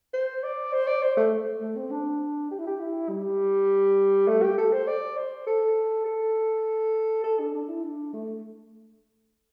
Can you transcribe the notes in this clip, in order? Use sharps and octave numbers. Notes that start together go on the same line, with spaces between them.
C5
D5
C5
D5
C5
A3
A3
C4
D4
G4
E4
G4
E4
G3
A3
G4
A4
C5
D5
C5
A4
A4
A4
D4
D4
E4
D4
A3